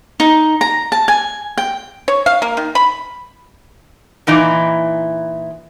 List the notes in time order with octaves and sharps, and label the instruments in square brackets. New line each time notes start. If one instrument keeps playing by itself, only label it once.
[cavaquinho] D#4
A#5
A5
G#5
G5
[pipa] C#5
F5
A#3
D#3
B5
[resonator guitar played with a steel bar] A#2 E3 D#4 E4